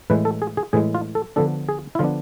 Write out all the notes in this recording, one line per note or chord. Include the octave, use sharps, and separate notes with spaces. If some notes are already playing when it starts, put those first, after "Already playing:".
A2 E3 G#3 B4
A4
G#4
G#4
A2 E3 G#3 G#4
F4
A4
D3 F3 B3 D4 A4
G#4
E4
D3 F3 B3 D4 F4